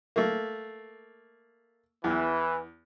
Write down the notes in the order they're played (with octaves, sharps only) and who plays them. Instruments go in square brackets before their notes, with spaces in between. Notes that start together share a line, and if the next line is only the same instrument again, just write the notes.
[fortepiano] A3 A#3
[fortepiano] E2 [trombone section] E3